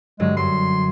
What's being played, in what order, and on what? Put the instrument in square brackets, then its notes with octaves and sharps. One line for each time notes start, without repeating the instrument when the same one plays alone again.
[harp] G2 D3 F#3 [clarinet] G#3
[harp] F#2 [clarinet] C6